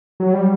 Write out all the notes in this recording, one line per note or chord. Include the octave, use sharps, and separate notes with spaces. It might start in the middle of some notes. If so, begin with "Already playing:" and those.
F#3
G3